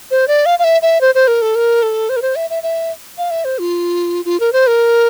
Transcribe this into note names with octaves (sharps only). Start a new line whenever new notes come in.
C5
D5
F5
F5
E5
E5
C5
C5
A#4
A4
A#4
A4
C5
A#4
C5
E5
E5
E5
F5
E5
C5
F4
F4
A#4
C5
A#4